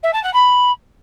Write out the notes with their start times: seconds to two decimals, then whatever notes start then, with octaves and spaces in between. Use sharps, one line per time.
0.03 E5
0.13 A5
0.23 F#5
0.33 B5